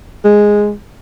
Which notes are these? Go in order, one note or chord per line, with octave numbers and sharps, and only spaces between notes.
G#3